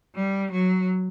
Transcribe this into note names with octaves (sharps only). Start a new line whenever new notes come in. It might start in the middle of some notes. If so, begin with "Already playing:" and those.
G3
F#3